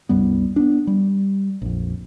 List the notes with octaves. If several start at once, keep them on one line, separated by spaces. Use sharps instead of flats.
C2 F#2 G3 B3
B3 C4 D4
G3
A#1 F2